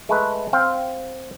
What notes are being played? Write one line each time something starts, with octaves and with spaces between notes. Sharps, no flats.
G#3 A3 B4
C4 F5 G5